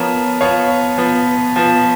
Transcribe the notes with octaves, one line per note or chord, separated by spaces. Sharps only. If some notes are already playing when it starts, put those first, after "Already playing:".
Already playing: F3 B3 A#4 C#5
F3 B3 C#5 F5
F3 B3
F3 B3